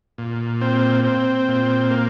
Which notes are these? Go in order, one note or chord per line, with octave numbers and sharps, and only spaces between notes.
A#2
C4
C4
A#2
A#3